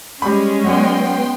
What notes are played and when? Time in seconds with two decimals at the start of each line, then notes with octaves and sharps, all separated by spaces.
0.22 G3 G#3 C#4 B5
0.64 F#3 B3 F#4 D5 G5 C6